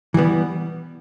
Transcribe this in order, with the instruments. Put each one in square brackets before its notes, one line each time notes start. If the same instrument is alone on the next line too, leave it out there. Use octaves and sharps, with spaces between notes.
[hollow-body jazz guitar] E3 G3 B3